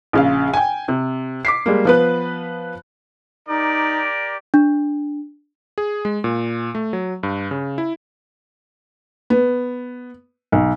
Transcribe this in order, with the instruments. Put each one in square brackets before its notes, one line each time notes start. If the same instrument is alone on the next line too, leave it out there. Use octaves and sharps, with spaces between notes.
[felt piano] A#1 C#3 F5
G5 G#5
C3
D6 B6 C7
G3 G#3 A#3
F3 B3 B4
[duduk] D#4 [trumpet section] G4 A#4 D5
[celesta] D4
[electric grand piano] G#4
G#3
A#2
A3
F#3
G2
C#3
E4
[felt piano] B3
B1